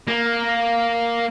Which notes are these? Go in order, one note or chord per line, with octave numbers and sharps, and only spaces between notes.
A#3